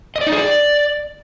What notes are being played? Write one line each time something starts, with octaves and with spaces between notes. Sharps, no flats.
D#5
D5
D#4
G#4
D5